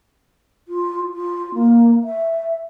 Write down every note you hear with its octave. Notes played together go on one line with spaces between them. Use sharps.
F4
F4
A#3
E5